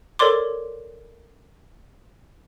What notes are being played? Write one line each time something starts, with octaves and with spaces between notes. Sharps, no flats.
A4 A#4 C#5 D5 C6 D6